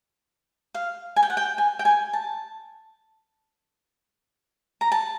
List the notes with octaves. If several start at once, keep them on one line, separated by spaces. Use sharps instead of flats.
F5
G#5
G5
F#5
G5
G#5
G5
G#5
A5
A#5
A5